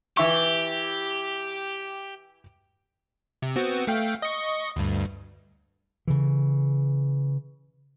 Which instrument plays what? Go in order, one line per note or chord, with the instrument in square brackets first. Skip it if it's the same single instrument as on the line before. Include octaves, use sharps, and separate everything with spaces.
[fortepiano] E3 E4 C#6 [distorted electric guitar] G4
[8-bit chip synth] C3
B3 C4 F#4
A3 F5 G5
D#5 C#6
D2 G2
[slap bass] C#3 E3